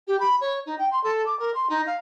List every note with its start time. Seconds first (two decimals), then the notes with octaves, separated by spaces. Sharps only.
0.08 G4
0.20 B5
0.41 C#5
0.66 D#4
0.78 G5
0.91 C6
1.04 A4
1.26 D6
1.39 A#4
1.54 C6
1.70 D#4
1.86 F5